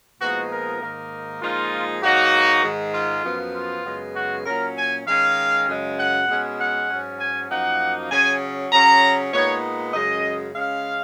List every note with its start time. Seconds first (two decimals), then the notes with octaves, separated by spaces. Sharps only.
0.19 A#2 F3 G#3 B3 D#4 F#4
0.50 A#4
0.81 G#2 D#3 A#3 D#4
1.41 A#2 F3 G#3 D#4 F4
2.02 G#2 F#3 A#3 D#4 F#4
2.63 G#2 D#3 G#3
2.94 F4
3.24 F#2 F3 B3
3.55 F4
3.85 F#2 C#3 G#3 B3
4.15 F#4
4.45 A#2 F#3 C#4 A#4
4.76 G#5
5.06 D#3 G#3 C#4 F5
5.68 F#2 C#3 G#3
5.98 F#5
6.28 B2 G#3 C#4
6.59 F#5
6.89 G#2 F#3 C#4
7.19 G#5
7.50 F#2 F3 A#3 D#4 F#5
8.11 C#3 F#3 C#4 G#5
8.72 C#3 F#3 C#4 A#5
9.33 A#2 G#3 B3 D#4 C#5
9.93 F#2 C#3 G#3 D#5
10.54 C#3 G#3 C#4 F5